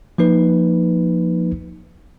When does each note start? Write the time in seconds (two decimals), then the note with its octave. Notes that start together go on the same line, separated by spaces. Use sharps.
0.18 F3 A#3 D#4 B4